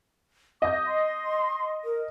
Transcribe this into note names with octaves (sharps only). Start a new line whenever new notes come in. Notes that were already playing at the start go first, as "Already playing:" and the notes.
D#5 D6 G6
C6
A#4